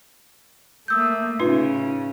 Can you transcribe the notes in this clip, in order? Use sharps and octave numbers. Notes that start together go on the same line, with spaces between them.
A3 A#3 D#6 E6 G6
A2 C#3 D#4 F4 B4